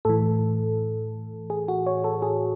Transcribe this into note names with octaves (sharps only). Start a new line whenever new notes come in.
A2 E3 A4
G#4
F#4
C#5
A4
G#4